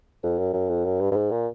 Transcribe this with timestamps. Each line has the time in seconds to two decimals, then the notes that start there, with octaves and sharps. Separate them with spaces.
0.23 F2
0.38 F#2
0.53 F#2
0.69 F2
0.85 F#2
1.01 G2
1.12 G2
1.16 G#2
1.31 A#2